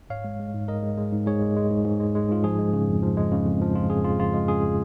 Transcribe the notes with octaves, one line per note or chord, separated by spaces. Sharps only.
G#2 C#5 F5
G#3
G#3
G#2
G#2 A#4 D#5
G#3
G#3
G#2
G#2 G#4 C#5
G#3
G#3
G#2
G#2
G#3
G#3
G#2 F4
F3 G#4
G#3
C#3
F2
F3
G#3
C#3
F2
F3
G#3 F4
C#3 G#4
F2 F4
F3 F4
G#3
C#3 G#4